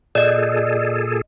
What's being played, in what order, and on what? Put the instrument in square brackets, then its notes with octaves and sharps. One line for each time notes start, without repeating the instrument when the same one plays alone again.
[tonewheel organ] A#2 G#4 A4 [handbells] D5 D#5